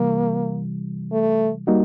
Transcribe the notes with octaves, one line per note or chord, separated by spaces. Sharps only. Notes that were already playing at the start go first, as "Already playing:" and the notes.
Already playing: C3 E3 G3 A#3
A3
G3 A#3 D#4 F#4